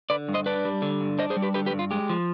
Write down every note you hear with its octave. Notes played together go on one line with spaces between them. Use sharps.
D3 B4 D5
G2
C5 D#5
D4 B4 D5
G3
D3
G2
D4 C5 D#5
G#4 C5
G3
G4 B4
D3 G4 B4
G4 B4
G2
F4
G#3 G4
F3